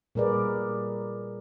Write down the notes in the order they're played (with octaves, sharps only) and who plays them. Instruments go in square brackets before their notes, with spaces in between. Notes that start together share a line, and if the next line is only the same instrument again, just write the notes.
[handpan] A#2 G3 G#4 A#4 B4 D5